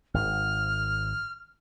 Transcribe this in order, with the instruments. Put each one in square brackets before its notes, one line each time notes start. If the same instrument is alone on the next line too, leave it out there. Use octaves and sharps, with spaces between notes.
[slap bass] G#1 [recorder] F6